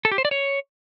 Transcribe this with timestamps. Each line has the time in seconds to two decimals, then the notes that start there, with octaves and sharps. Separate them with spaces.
0.05 A4
0.11 G4
0.18 C5
0.25 D5
0.31 C#5